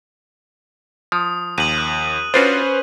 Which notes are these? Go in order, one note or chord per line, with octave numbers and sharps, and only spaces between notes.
F3 D#6
D#2 D#7 F#7
F#6
C#4 D4 F4 F#4 B4 C5